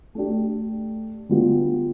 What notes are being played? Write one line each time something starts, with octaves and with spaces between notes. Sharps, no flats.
A3 D4 G4
D3 G3 B3 F4